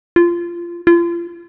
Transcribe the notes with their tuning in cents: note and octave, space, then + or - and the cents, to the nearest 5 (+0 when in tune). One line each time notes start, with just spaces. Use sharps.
F4 -20
F4 -35